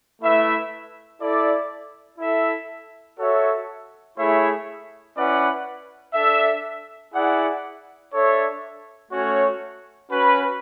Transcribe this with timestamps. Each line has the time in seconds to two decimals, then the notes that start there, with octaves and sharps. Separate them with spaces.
0.20 A3 E4 B4 E5
1.19 E4 A4 D5
2.17 E4 A4 E5
3.17 F#4 A4 C#5 E5
4.16 A3 E4 G#4 C#5 E5
5.15 C#4 E4 B4 D5 F#5
6.14 D4 A4 E5
7.13 E4 G#4 D5 F#5
8.12 D4 A4 C#5 E5
9.11 A3 C#4 F#4 C#5
10.09 C#4 F#4 B4